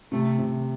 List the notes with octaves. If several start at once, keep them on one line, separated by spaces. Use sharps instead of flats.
C3 A3
C3